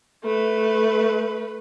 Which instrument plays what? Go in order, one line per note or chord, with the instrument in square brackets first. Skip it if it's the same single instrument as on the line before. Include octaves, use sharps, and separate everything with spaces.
[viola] A3 B4